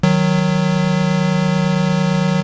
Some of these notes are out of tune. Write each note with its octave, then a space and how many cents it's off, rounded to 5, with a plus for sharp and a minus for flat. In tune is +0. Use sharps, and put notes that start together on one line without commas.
D#3 +0 F#3 -5